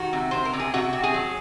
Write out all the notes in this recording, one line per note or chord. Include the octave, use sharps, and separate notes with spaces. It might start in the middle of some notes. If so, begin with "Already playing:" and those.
Already playing: D#3 F#4
C3
C3 C5
A#4
C3
G#4
C3 F#4
C3
G#4
F#3